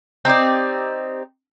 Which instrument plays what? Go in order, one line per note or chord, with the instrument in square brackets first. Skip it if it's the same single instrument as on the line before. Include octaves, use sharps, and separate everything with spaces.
[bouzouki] C4 D#4 G4 D5